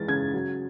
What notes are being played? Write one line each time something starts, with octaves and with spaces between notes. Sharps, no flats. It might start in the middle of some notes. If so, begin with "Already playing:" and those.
Already playing: E3 G#3 A6
C#3 G#6
F#3